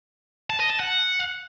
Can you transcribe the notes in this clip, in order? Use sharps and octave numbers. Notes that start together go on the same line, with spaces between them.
A5
D#5
A5
F#5